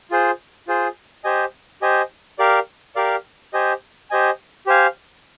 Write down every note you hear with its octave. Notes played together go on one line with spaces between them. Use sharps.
F4 G#4 C5
F4 G#4 C5
G4 C5 D#5 G#5
G4 C5 D#5 G#5
G4 A#4 D5 F5
G4 A#4 D5 F5
G4 C5 D#5 G#5
G4 C5 D#5 G#5
G4 C5 F5 G#5